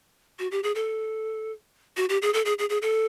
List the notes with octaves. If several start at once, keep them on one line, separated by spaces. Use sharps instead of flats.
F#4
G4
G#4
A4
F#4
G4
G#4
A4
G#4
G#4
G#4
A4